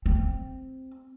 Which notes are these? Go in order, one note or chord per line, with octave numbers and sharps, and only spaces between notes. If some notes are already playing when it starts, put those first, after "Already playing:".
C4